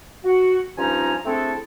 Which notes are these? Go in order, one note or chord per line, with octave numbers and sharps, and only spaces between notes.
F#4
G2 F3 C#4 D#4 G#5 A#5
A3 C4 D4 E4 G#4 A4